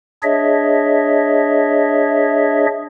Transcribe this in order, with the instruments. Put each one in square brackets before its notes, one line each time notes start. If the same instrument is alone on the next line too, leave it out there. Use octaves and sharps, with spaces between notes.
[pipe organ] D4 G#4 C#5 D#5 E5